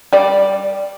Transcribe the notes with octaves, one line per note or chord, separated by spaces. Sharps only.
G3 D5